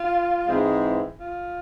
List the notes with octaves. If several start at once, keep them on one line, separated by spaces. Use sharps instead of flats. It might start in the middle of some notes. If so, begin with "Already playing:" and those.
Already playing: F4
G#2 E3 G#3 C4 E4
F4